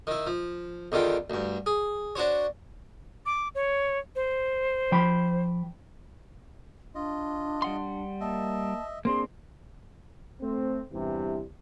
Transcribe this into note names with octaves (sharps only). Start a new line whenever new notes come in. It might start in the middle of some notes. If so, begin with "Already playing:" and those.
D#3 E4
F3
E2 D3 D#3 F4 G5
D2 G2
G#4
D4 F#4 C5 C#5
D6
C#5
C5
F3 G5 B5
D4 F4 D#5
G3 F#5 C6
A#3 D#5 E5 A5
A#3 C4 D4 G#4 C6
A3 C4
E2 G2 C3 E3 G3